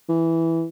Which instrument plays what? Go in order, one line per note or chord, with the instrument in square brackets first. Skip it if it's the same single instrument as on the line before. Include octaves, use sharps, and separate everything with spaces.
[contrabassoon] E3